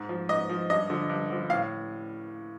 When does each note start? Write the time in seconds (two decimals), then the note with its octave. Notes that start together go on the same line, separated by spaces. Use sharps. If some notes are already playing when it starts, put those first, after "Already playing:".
Already playing: G#2
0.09 F3
0.29 G#2 D#5
0.49 F3
0.70 G2 D#5
0.90 D3 F3
1.09 G2
1.30 D3 F3
1.49 A2 F5